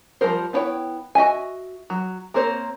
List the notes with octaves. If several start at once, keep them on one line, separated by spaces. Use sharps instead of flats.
F3 G3 E4 A#4 C5
B3 D4 E4 C#5 G5
F#4 D#5 E5 G#5
F#3
A#3 C4 A#4 C5 C#5